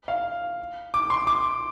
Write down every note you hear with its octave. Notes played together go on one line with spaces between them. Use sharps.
F5
D6
C6
D6